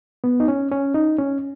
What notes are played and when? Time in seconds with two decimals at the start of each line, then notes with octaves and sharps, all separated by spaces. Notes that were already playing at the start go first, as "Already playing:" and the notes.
0.24 B3
0.40 D#4
0.48 C#4
0.71 C#4
0.94 D#4
1.19 C#4